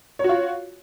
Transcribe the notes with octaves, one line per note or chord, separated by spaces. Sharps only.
F4 F#4 C#5